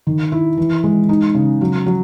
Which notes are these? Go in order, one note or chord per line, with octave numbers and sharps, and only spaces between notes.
D#3
E4
E3
G#3
D#4
C#3
F#3
F#3